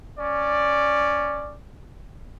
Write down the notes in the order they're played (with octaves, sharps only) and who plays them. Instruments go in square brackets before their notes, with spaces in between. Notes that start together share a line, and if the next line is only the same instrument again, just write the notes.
[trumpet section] C#4 D5